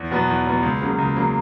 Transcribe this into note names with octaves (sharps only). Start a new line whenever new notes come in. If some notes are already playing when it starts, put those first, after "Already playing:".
Already playing: E2
B2 F#3 B3
E2
B2 F#3 B3
C#2
C#3 F#3 A#3
C#2
C#3 F#3 A#3